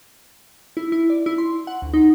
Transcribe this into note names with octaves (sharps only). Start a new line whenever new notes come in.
E4
E4
D5
E4
C6
F#5
D2
D#4